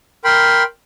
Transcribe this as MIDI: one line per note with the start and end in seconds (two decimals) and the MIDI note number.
0.25 0.63 70
0.25 0.63 79
0.25 0.63 83
0.25 0.63 84